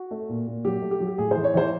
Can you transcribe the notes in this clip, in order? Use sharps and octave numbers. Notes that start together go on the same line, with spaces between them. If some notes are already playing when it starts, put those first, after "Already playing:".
Already playing: F#4
A3
A#2
A#2
F#3 G4
A3
G4
F#3
G4
A2 G#4
E3 C5
C#5
E3 C5